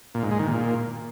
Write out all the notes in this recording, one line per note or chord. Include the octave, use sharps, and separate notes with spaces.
A#2
G#2
G#3
D#3
A#2